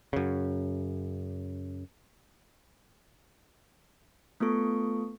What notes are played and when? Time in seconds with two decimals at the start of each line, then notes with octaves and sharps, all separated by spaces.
0.13 F#2 C#3
4.40 A3 B3 F4 A4 C#6